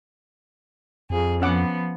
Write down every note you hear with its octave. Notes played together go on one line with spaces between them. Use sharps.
F2 G#4
F3 B3 C#4 F#5 D6